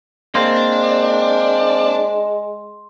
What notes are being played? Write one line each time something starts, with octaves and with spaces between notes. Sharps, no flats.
G#3 A#3 C4 D4 C6